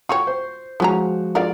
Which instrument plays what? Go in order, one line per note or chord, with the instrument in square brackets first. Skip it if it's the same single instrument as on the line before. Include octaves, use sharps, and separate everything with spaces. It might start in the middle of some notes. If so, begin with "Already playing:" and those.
[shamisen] F4 F#4 C#5 [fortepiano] G5 [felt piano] C#6
[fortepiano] C5
[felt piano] F3 G#3 F#4 [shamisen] B3 C#4 A#5
[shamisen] D3 A#4 [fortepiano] F4 G#4 D5